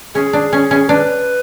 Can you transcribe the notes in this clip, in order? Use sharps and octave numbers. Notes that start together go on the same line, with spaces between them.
C#4 G#4
D4
C#4
C#4
D4 B4